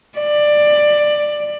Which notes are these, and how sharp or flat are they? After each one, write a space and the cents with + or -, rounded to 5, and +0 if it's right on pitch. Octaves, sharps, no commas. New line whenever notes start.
D5 +15